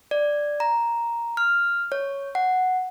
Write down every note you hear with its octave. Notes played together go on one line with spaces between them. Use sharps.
D5
A#5
F6
C#5
F#5